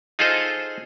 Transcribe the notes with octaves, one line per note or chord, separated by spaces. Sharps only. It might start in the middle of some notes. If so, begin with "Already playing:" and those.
D#4 F4 G#4 A4 C5 D#5